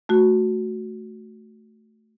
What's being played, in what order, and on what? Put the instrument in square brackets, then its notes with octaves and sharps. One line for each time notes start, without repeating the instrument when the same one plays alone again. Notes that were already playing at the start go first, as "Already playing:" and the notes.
[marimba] A3 F#4